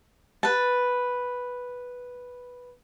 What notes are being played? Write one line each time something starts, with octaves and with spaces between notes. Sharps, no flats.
B4 A5